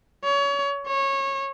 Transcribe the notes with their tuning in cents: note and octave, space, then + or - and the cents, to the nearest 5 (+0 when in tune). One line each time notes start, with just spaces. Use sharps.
C#5 +30
C#5 -20